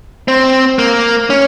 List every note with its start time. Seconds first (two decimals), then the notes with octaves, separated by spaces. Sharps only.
0.28 C4
0.79 A#3
1.30 C#4